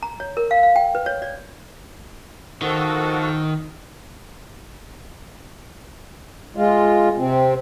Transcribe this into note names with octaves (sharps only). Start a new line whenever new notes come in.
A#5
C#5
A#4
F5
F5
G5
B4
C#5
D5
D#3 F3 F#4 A4
G#3 F4
C3 C4